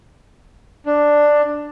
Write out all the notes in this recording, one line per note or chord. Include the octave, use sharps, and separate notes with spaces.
D4